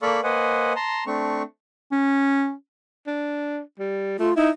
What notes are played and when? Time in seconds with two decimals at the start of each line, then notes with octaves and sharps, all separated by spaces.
0.02 A#3 A4 D5 F5 B5 C#6
0.24 A#3 B4 C5 D#5 F#5 G#5
0.76 A5 A#5 C6
1.07 A3 C4 D4 C#6
1.92 C#4
3.07 D4
3.79 G3
4.19 A3 F4
4.36 D#4 E4